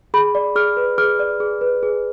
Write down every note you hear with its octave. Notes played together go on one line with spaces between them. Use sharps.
G#4 B5
D5
G#4 F6
B4
G#4 F6
D5
G#4
B4
G#4